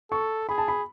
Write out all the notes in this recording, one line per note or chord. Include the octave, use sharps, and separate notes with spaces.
A4 C#6
G#4 B5
A5
B5